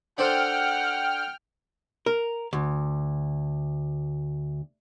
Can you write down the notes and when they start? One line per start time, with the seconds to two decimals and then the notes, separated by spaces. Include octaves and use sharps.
0.18 D4 A4 C5 F#5 G5 F6
2.06 A#4
2.53 D2